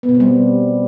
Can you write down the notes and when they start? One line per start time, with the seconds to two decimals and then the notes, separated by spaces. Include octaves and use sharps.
0.03 B3
0.09 B2
0.14 C4
0.20 G3